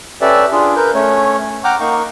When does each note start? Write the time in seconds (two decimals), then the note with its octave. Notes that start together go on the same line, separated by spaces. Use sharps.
0.21 C#4 G4 A4 B4 D5 E5
0.52 D4 F4 G#4
0.76 A#4 B4 G6
0.94 A3 C#4 C#5
1.64 F#5 G5 A#5 D6 F6 G6
1.80 A#3 D#4 F5 C#6